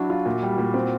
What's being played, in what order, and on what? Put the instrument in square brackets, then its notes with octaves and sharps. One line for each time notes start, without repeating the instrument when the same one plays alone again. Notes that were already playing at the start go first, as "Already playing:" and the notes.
Already playing: [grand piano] F#3 D4 [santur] E4 F#4
[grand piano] F4
A#2
G3
A#2
C4